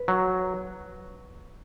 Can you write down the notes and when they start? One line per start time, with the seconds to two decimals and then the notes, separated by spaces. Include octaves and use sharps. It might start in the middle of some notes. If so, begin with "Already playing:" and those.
Already playing: B4
0.08 F#3